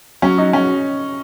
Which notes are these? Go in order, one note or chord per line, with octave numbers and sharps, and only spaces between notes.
F#3 C#4
D#4 F#4
F#3 C#4